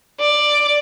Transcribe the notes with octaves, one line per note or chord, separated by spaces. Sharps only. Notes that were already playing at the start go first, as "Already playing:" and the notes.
D5